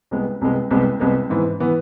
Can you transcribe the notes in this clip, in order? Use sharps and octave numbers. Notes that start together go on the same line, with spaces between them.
C2 C3 G#3 B3
C2 C3 G#3 B3
C2 C3 G#3 B3
C2 C3 G#3 B3
G#2 E3 B3
E3 B3